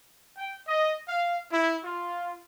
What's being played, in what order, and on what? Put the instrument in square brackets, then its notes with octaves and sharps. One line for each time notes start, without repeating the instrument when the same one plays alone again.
[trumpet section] G5
D#5
F5
E4
F4